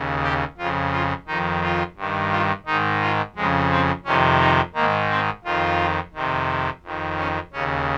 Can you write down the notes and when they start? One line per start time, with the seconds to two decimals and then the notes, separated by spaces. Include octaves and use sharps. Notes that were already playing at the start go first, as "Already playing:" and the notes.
Already playing: D#2 C#3
0.23 G4
0.58 F2 C#3 F4
0.92 F4
1.27 F2 D#3 D#4
1.62 F4
1.97 G2 D#3
2.31 F4
2.66 G#2 D#3 D#4
3.01 F4
3.36 F2 C#3 G#3
3.71 C4
4.05 F2 C3 D#3 C#4
4.40 D#4
4.74 G#2 D#3 A#3
5.10 C4
5.44 F2 D#3 F4
6.14 F2 C3 D#3
6.83 F2 D#3
7.18 C#4
7.53 D#2 C#3 C#4